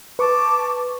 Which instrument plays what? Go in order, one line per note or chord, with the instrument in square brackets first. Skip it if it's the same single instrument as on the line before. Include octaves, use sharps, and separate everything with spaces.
[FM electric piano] B4 C#6 [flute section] A5 D6